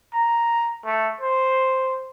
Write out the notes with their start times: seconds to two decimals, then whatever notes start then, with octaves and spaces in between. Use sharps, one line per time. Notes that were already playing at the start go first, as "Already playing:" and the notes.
0.13 A#5
0.85 A3
1.21 C5